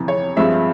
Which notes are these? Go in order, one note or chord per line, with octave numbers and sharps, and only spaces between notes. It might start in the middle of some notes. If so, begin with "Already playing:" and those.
Already playing: G1 F2 C3 E3
C#5
G2 F3 G#3 C4 E5